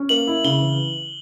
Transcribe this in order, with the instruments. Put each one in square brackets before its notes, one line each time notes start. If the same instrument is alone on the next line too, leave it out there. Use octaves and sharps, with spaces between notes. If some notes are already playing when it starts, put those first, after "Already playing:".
Already playing: [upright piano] C#4
[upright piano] A#3 [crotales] F#7
[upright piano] E4
[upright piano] C#3 [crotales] G7
[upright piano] E3